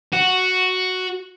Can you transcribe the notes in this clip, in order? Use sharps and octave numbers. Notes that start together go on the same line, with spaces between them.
F#4